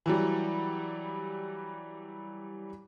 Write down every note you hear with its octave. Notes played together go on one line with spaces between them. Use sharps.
E3 F#3 G3